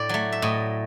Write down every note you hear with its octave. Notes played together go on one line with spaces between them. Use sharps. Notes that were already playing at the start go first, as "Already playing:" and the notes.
Already playing: A2 D5
F#3 A3
E5
A2 D#5